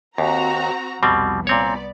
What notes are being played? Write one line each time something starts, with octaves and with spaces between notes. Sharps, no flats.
D#2 C4 F#4 A#5
C2 F2 B2 G3 C4
A#2 B3 C4 C#5 D5